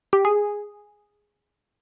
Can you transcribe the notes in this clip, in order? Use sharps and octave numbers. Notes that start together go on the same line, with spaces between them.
G4
G#4